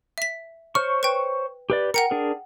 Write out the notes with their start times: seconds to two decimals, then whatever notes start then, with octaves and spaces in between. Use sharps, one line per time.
0.18 E5 B6
0.75 C5 C#5 C#6 F6
1.03 B4 G5
1.70 G4 B4 D5
1.94 A#4 F#5 G5 C#7
2.11 D4 G#4 A#4